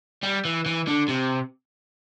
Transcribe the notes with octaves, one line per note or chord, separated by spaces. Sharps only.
G3
E3
E3
D3
C3